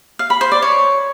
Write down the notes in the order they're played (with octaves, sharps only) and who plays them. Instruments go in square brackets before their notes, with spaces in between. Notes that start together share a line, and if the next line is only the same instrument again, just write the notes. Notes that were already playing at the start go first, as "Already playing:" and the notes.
[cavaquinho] F5
B5
C5
D5
C#5